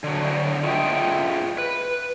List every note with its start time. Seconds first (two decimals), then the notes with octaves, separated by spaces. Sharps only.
0.04 D3 F#3
0.64 F4 G#4 A4 D#5 E5 G5
1.58 B4